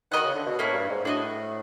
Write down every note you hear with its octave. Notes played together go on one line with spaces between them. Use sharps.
D#3 A#4 D#5 F#5
F#4
C#3
D3
B2
A2 A#3 C#4 E4
G2
G#2
A2 D4 F#4 B4 D#5